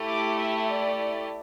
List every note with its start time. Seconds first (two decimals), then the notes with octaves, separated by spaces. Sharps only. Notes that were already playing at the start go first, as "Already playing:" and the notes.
Already playing: A3 E4 G4
0.08 D6
0.39 E5
0.69 D5